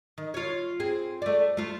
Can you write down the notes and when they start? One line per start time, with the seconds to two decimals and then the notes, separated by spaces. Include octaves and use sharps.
0.18 D#3
0.34 F4 C#5
0.80 C4 G#4
1.22 A3 D5
1.57 A3 F4